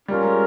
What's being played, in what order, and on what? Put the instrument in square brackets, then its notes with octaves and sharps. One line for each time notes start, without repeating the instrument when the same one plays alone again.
[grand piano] G3 [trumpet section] C#4 F4 A#4
[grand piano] G#3